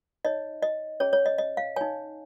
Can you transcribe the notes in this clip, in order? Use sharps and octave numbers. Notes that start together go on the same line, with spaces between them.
D#4 C#5 D#5
D#5
C#4 G#4 C#5
C#5
D#5
D#5
F5
D#4 C#5 G#5